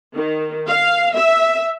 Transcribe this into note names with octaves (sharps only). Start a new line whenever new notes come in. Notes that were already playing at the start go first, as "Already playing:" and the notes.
D#3
F5
E5